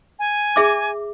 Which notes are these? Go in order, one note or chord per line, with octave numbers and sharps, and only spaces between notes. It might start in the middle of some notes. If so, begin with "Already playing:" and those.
G#5
G#4 E5 D6